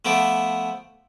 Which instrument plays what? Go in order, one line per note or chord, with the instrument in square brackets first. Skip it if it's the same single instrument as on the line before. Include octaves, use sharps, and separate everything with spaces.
[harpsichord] F3 A3 B3 D6